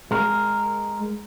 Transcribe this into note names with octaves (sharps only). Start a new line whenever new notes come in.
G#3 A#4